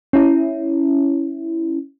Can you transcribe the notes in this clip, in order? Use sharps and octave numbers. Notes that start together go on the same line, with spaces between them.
C#4 E4